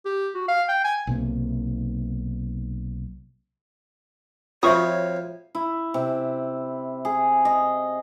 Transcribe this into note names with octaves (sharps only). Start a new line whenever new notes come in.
G4
F#4
F5
G5
G#5
B1 C3 A#3
F2 F4 F#4 C5 C#5 E5 C#6 D#6
E4
C3
G#4
D#5